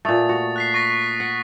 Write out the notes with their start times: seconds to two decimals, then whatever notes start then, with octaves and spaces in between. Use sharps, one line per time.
0.05 A#2 A3 D#6 A6
0.29 F#4
0.56 F#6 B6 C7
0.74 C#6 A#6 B6
1.20 F#5 B6